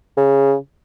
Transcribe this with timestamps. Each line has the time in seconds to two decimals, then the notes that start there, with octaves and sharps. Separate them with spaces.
0.17 C#3